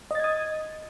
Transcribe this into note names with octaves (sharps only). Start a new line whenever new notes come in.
D#5 D#6 G#6 A6